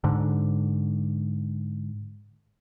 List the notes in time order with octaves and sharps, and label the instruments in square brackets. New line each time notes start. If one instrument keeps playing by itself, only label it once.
[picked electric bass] G#2 D3